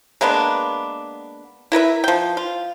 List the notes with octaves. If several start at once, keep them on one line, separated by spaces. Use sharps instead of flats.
G#3 A#3 B3 D4
E4 A#4 B4 E5
F3 G5
F4